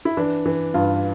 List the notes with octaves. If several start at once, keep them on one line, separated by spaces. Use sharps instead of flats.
E4
E3 D4
E3
G2 F4